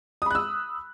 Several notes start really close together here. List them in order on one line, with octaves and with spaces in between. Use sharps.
D#6 B5 F#6 E6